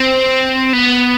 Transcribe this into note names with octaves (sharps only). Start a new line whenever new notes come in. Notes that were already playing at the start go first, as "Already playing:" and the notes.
Already playing: C4
B3